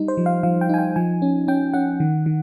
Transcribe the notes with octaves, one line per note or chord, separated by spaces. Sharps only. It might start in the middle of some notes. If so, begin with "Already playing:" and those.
Already playing: G3 D#4
C5
F3
F5
F3 F5
G5
D#4 G#5
G5
F3 G#5
C#4
C#4 G5
C#4 F#5
D#3
D#3